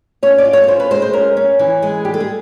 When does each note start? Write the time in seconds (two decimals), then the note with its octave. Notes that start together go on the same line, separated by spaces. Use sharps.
0.23 C#4 C#5
0.38 D5
0.45 F4
0.53 C#5
0.64 C#5
0.68 C#4 C5
0.80 B4
0.91 G#3 C5
1.02 C5
1.13 C#4 A#4
1.37 C#4
1.59 E3
1.83 G#3
2.05 G3 G4
2.14 A4
2.20 G#4